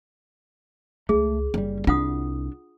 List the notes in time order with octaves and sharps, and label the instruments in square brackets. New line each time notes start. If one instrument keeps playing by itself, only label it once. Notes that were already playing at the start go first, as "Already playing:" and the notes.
[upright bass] C#2 [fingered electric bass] A3 [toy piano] G#4
[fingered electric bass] F#1 G3 [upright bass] C#4
[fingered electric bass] C2 [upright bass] D4 [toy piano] F4 F#5 D#6